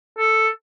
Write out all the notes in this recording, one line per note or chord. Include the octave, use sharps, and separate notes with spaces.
A4